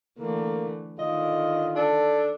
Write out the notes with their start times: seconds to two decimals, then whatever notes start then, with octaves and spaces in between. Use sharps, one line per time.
0.18 D3 E3 A3 A#3
0.99 D3 D#3 F4 D#5
1.76 D4 A4